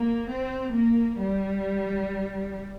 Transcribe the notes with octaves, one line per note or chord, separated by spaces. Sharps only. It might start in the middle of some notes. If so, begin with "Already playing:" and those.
Already playing: A#3
C4
A#3
G3